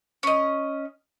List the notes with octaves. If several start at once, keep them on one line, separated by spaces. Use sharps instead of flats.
C#4 D#5